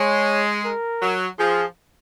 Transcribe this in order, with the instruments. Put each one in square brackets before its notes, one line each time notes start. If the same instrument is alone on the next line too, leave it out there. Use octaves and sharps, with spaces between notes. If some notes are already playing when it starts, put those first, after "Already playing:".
Already playing: [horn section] G#3 [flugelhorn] C#5
[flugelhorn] A#4
[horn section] F#3
[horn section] F3 [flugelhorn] G#4